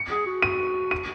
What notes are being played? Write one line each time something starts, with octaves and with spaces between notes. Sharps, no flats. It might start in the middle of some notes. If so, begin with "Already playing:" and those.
Already playing: C#7
G#4
F#4
D#7
D#7